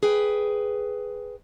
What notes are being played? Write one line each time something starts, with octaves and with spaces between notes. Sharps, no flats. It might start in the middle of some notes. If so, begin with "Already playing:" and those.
G#4 B4 G5